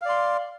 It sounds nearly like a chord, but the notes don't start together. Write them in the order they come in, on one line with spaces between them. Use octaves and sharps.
F5 D5 C6